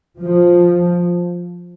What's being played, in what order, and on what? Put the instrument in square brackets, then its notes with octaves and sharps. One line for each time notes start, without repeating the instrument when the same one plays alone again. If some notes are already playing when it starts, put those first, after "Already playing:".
[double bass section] F3